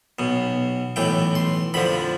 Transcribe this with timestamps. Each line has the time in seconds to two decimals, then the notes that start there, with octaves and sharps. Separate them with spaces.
0.19 B1 B2
0.96 B1 A2 E3 G5
1.35 C6
1.74 F2 D3 F3 B5